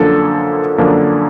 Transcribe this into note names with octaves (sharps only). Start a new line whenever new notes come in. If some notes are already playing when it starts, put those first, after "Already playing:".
Already playing: F#2 D3 F3 A#3 D4 A4
F#2 D3 F3 A#3 D4